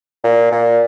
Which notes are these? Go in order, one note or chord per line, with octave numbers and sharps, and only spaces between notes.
A#2
A#2